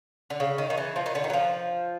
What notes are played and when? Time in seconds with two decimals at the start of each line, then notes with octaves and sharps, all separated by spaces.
0.30 D3
0.40 C#3
0.58 D#3
0.70 D#3
0.77 E3
0.96 F3
1.06 D#3
1.15 D3
1.24 D#3
1.30 F#3
1.33 F3